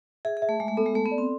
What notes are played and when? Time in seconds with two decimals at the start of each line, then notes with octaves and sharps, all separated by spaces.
0.25 G#4 E5
0.37 G#4
0.42 E5
0.49 A3
0.60 G#3 E5
0.68 A3
0.77 B3 A4
0.86 G#3
0.94 A3 A4
1.06 B3
1.11 D5
1.18 C4